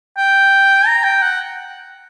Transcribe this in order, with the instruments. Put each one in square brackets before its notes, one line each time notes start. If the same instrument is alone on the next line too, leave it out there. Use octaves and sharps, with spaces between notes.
[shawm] G5
A#5
G5
F#5